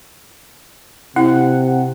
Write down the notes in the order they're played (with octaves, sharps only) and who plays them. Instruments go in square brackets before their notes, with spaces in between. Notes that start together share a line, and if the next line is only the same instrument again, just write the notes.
[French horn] C3 [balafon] E4 [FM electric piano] F#5